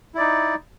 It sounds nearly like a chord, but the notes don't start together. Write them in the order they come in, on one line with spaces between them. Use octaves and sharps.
E4 D5 D#4